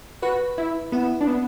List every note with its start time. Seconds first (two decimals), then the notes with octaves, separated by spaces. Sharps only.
0.22 F#4 B4
0.58 E4
0.92 B3 E4
1.21 D4
1.27 B3